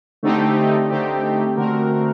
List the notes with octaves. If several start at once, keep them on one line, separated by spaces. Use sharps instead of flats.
D3 A3 C4 D#4 G4
D3 A3 C4 D#4 G4
D3 A3 C4 F#4 A#4